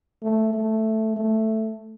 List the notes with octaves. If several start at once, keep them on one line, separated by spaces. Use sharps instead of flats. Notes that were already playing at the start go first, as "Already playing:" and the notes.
A3
A3
A3